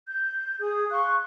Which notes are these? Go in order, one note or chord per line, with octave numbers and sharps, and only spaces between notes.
G6
G#4 D#6
F5 C6 C#6 F#6